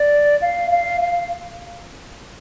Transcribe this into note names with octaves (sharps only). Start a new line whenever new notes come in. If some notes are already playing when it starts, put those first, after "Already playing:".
Already playing: D5
F5
F5
F5